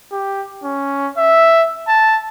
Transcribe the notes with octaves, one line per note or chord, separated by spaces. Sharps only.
G4
C#4
E5
A5